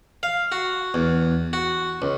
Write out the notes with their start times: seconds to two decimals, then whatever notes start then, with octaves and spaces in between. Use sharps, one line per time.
0.23 F5
0.52 F#4
0.94 E2
1.53 F#4
2.02 C#2